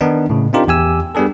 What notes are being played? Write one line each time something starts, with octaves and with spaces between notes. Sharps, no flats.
D#3 B3 D4 D#4
A2 C#3
C4 D4 D#4 F4 G4 A#4
E2 G4 G#5 E6
G3 B3 D4 G#4 A4